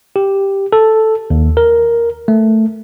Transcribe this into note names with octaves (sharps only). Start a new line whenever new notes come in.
G4
A4
D#2
A#4
A3